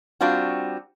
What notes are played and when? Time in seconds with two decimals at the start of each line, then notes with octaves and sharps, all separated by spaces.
0.21 G3 C4 D4 F4 F#4